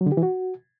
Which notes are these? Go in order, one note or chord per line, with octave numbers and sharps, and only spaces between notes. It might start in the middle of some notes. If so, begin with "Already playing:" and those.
F#3
D3
G4
E3
F#4